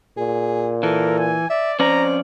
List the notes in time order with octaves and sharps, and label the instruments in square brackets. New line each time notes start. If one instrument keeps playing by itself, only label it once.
[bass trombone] A#2 [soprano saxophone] G#4
[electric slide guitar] E3 [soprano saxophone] A4 [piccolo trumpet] A#4
[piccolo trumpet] G#5
[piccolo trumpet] D5 [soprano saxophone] E5
[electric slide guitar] F2 C#4 D5 [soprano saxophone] C5 [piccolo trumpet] A#5